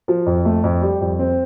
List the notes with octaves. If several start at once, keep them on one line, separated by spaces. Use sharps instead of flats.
F3
F2
A3
F2
G3
F2
C4